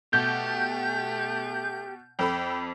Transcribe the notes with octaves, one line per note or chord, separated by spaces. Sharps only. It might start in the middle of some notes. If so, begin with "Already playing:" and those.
B2 A3 G4 G6
F2 A4 G5 B5